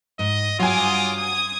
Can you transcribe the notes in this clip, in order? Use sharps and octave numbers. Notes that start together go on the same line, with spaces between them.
G#2 D#5
G2 F#3 F4 F5 G#5 D6 D#6
D#6 G#6